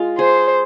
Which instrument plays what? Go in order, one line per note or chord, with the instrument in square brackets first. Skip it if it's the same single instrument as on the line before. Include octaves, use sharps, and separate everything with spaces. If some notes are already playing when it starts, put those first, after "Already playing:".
Already playing: [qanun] G#3 F4
[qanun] G#4 [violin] C5